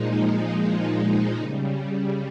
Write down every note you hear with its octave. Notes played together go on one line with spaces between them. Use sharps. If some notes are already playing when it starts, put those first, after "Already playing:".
Already playing: A#2 F3 G#3 D#4
C#3 G3